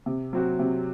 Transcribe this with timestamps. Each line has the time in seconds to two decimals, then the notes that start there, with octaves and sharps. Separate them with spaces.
0.06 C3
0.33 F#3 C4 F#4
0.59 C3